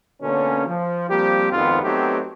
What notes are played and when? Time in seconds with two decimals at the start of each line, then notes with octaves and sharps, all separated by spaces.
0.22 B2 D3 A#3 C#4
0.66 F3
1.09 F3 G3 A#3 C4 G4
1.52 G#1 F2 D#3 B3 C4 F4
1.83 F#3 A3 B3 C4 D#4 G4